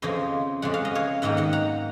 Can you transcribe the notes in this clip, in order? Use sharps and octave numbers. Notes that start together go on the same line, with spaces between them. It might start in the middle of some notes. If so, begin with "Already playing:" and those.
F2 C#3 F3 C5 D#5
F2 C#3 G#3 F#5
F5
D#5
C#5 F5
G#2 D#3 A#3 D#5 F#5
D#5 F#5
F#5 A#5